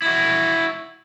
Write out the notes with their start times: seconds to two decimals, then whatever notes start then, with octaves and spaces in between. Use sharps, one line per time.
0.02 E4 F#4